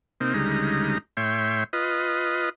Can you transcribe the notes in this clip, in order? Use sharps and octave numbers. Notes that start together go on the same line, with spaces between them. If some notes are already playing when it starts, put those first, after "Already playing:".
C3 A#3 C4 D#4
D2 C#3 G3 G#3 D#4 A#5
A2 C#5 E5 G5 C6
F4 B4 D#5